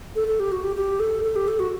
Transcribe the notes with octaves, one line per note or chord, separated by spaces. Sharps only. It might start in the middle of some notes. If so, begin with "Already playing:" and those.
A4
A4
G4
F#4
G4
G4
A4
A4
G4
A4
F#4